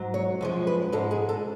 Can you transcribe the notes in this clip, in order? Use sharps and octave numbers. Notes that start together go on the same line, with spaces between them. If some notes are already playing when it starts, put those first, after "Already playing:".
Already playing: G#2 F#3
C#5
F#2 F3 G#3
B4
G#2 G#3 A4
G#4
A4